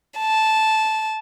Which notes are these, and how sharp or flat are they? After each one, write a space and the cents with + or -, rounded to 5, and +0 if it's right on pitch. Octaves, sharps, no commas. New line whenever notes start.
A5 -10